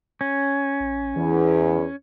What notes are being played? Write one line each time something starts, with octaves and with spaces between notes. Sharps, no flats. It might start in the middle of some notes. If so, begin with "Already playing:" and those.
C#4
A1
E2 E3